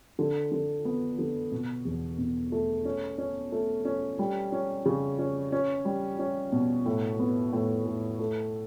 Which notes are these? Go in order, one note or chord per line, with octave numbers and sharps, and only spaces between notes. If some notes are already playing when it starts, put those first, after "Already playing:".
D3
D3
B3
D3
B2
E2
B2
A3
C#4
C#4
A3
C#4
G3
C#4
C#3
C#4
C#4
G3
C#4
B2
A2
B3
A2
A2
A3